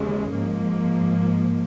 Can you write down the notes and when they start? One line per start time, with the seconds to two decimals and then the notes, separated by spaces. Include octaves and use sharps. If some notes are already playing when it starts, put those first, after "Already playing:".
Already playing: D#2 C#3 E3 G#3
0.31 G#2 F3 A#3